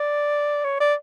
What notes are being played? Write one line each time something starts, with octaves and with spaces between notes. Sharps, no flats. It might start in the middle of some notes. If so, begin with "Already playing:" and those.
Already playing: D5
C#5
D5